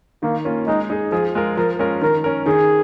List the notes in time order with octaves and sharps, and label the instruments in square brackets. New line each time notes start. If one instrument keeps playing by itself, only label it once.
[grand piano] D#3 [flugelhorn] A#3
[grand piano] A#3 C#4 F4
[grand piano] G#3 [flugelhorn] D#4
[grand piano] D#4 G#4
[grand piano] F3 [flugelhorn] G#4
[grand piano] G#3 F4 A#4
[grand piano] F3 [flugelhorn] A#4
[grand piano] G#3 C#4 F4 A#4
[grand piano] D#3 [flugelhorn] A#4
[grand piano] C#4 A#4
[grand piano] D#3 [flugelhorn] G#4